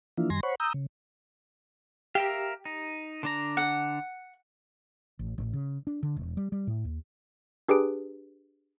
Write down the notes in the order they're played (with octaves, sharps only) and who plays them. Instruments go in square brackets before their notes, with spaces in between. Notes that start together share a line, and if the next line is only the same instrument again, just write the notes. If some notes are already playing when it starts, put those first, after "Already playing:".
[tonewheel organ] E3 F3 A#3 D4 E4 F4
F#2 D#3 G3 G#5 C6 A#6
C5 C#5 F#5 B5 C#6
A#5 D#6 E6 G6
C#3
[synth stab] G4 [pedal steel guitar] A#4 E5 F5
[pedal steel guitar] D#4
D3 D4 A#5
[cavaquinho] F#5
[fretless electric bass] A1
A1
C#3
D4
D3
E1
G3
G3
A2
D#2
[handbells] D4 G4 G#4 B4 D7